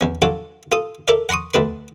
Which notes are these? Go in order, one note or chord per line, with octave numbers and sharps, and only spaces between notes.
E2 C#4
F#3 D4 F4 F#4 A4
F4 A4 D#6
A4 A#4 D5 E5 F5
F#5 A#5 C6 C#6 D#6
D2 A3 D4 B4 C6